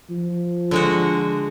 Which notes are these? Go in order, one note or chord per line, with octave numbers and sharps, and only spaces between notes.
F3
D3 G#3 F#4